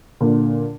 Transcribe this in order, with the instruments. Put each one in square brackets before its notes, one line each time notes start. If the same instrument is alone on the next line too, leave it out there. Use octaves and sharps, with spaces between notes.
[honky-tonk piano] A#2 D3